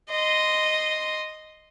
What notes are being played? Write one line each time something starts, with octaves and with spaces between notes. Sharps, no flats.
D#5 C6